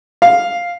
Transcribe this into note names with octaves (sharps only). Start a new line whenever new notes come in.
F5